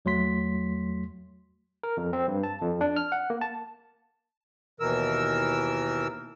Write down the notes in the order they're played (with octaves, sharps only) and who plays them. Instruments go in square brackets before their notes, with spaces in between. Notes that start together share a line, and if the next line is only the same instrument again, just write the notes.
[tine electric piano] E2 F#3 A3 C6 B6
A#4
F2
C4
G2
A5
F2
D4
F6
F#5
A#3
A5
[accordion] D#2 B2 E3 A#4 E6